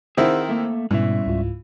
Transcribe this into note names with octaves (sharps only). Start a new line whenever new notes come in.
D#3 C4 E4 G#4 C5 F#5 G5
A3 A#3
G#2 B2 E3 G3 C#4 E5
C#2 G#2 F4